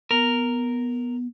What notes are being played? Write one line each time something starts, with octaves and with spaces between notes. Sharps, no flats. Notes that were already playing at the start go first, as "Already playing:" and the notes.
B3 A#4